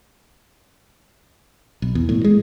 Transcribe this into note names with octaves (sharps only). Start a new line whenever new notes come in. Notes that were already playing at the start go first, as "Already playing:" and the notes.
B1
E2
A2
G#3